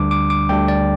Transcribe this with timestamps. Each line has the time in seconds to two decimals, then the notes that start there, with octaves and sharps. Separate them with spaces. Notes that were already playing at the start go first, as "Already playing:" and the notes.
Already playing: D2 D3 G3 D4 D6
0.11 D6
0.30 D6
0.49 D2 D3 G3 D4 G5
0.68 D5